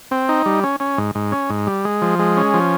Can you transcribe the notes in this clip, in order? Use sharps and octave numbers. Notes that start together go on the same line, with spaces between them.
C4
D#4
G3
C#4
C#4
G#2
G#2
C#4
G#2
G3
G#3
F3
G#3
C#4
F3